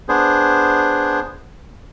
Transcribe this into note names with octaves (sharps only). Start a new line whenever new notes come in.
B3 D4 G#4 C5